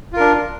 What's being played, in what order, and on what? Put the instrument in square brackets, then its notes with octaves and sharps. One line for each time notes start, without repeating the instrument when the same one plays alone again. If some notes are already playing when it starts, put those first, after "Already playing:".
[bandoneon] F4
A#4
D4